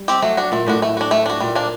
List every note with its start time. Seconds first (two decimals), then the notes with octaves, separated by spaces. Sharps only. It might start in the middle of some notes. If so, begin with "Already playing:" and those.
Already playing: G3
0.08 C4 G4
0.22 F#3 A3
0.37 D4 F#4
0.52 A#2 A3
0.66 A2 D4 F#4
0.82 A3
0.97 D4 F#4
1.11 A3
1.26 D4 F#4
1.40 A#2 G3
1.55 A#3 D4